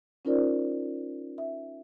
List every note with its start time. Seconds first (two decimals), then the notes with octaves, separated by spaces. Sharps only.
0.25 C#4 D#4 F4 A#4 C5 D5
1.38 E5